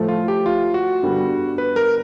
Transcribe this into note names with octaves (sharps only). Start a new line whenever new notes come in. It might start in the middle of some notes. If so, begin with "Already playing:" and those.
Already playing: A2 F3 A3
F4
G4
F4
F#4
G2 D3 G3 B3
B4
A#4